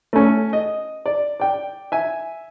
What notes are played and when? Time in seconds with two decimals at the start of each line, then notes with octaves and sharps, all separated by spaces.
0.13 A3 C#4
0.53 D#5
1.06 D5
1.40 D5 G5
1.92 E5 G#5